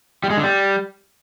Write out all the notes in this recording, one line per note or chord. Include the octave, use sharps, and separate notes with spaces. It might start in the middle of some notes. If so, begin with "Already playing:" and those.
G3
G#3
D3
G3